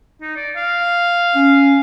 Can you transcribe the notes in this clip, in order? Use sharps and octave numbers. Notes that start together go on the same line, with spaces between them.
D#4
D5
F5
C#4